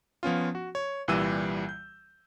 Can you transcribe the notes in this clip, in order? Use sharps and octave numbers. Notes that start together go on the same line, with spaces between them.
F3 B3 C#4 F4
F#4
C#5
C2 A#2 E3 G3 E6 D#7
G6